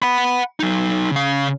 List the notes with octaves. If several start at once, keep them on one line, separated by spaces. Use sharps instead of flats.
F#5 B5
F#3 D#4
C#3 F5